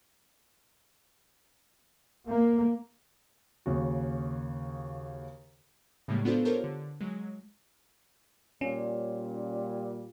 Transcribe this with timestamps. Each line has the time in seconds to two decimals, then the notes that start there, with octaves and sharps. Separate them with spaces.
2.27 A#3
3.66 D#2 C#3 F#4
6.08 A2 C#3 G3 G#3 A#3
6.25 B3 D4 F4 F#4 A4 C5
6.45 F4 G4 A4 A#4 C5 C#5
6.64 D3
7.01 F#3 G#3
8.61 A#2 G3 C#4